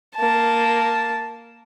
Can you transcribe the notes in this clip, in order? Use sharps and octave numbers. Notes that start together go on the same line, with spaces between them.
A#3 A5